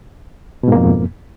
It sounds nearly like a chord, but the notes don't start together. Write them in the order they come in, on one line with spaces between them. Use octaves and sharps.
B2 G#2 A#3 F2